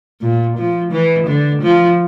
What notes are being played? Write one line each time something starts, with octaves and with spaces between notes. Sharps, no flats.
A#2
F3
E3
D3
F3